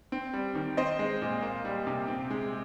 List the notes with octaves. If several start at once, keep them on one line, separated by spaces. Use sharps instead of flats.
C4
G3
D#3
C4 C5 D#5
G#3
A#2
A#3
G3
C3
C4
G#3